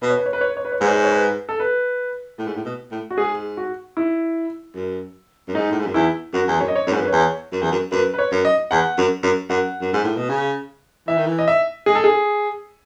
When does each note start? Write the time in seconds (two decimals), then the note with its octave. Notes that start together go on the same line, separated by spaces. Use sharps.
0.02 B2 B4
0.10 C#5
0.17 B4
0.26 C#5
0.33 B4
0.41 C#5
0.48 B4
0.57 C#5
0.65 B4
0.72 C#5
0.80 G#2 B4
0.88 C#5
0.96 B4
1.04 C#5
1.11 B4
1.49 A4
1.60 B4
2.39 A2
2.48 G#2
2.56 A2
2.66 B2
2.91 A2
3.10 F#4
3.18 G#2 G#4
3.57 F#4
3.97 E4
4.75 F#2
5.48 F#2
5.55 G#2 D#4
5.72 A2
5.79 G#2
5.87 F#2
5.94 E2 E4
6.33 F#2 F#4
6.48 E2
6.60 F#2 C#5
6.68 D#5
6.76 C#5
6.87 F#2 C#5
6.93 G#2
6.97 F#2 B4
7.08 E2 C#5
7.52 F#2
7.62 E2
7.72 F#2
7.92 F#2 B4
8.14 B4
8.19 C#5
8.31 F#2
8.45 D#5
8.71 E2 F#5
8.98 F#2
9.23 F#2
9.50 F#2 F#5
9.81 F#2
9.93 G#2
10.04 A2
10.17 B2
10.29 C#3
11.08 E3 E5
11.17 D#3
11.27 E3
11.39 D#5
11.48 E5
11.86 G#3 G#4
11.95 A4
12.04 G#4